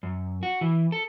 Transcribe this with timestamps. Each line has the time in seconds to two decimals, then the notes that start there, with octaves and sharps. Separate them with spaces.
0.03 F#2
0.43 F#4
0.61 E3
0.92 A4